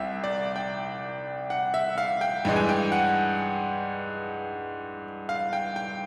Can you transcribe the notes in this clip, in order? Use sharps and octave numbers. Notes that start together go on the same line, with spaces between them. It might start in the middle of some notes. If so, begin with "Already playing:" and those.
Already playing: C2 E5 G5
D5
G5
F#5
E5
F5
G5
G2 E3 G#3 G5
G#5
G5
F#5
F5
G5
G5